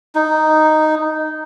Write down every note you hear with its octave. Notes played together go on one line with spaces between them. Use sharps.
D#4